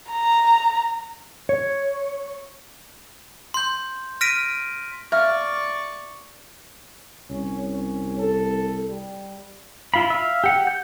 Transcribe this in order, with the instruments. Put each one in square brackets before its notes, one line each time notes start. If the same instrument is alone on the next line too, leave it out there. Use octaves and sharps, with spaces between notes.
[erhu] A#5
[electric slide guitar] C#5
[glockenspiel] C6 G6
F6 A#6 B6 D7 D#7
[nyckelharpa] D5 C#6 [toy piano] E5 F5 [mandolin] F6
[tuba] C2 [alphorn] C#4
[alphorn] C#4
A4
G3
[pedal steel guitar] E4 F4 F5 B5
E5 F5
G4 F#5
G6